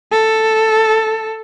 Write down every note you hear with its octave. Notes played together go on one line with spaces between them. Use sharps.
A4